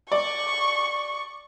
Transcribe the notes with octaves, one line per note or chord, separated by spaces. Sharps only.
D5 C#6